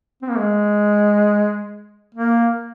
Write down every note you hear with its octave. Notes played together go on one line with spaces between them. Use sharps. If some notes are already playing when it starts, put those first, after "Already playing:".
C4
A#3
G#3
A#3